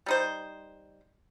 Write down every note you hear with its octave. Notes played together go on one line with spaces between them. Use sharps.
G3 D#4 C5